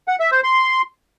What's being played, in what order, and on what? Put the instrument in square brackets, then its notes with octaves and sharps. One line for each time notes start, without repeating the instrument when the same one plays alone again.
[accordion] F#5
E5
C5
C6